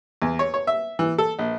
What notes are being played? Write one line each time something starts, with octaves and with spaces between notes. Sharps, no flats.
E2
C#5
C#5
E5
E3
A4
A#1